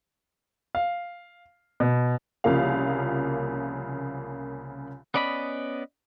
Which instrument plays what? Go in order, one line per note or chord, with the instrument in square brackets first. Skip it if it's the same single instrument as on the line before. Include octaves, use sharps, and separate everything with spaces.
[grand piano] F5
B2
[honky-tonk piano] C2 C#3 F3 A#3 F5
[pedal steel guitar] B3 C#4 D5 D#5 B5